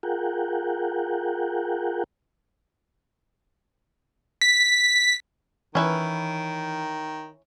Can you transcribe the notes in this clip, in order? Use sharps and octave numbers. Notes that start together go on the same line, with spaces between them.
F4 G#4 A#4 F#5 G5
B6
D#3 E3 C#4 E4 B4